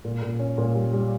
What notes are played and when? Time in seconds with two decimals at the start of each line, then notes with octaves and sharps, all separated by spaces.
0.05 A#2
0.22 A#2
0.39 C#4
0.58 A#2
0.75 G3
0.93 G3